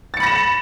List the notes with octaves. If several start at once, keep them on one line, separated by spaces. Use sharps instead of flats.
B5 A6 A#6 C#7 E7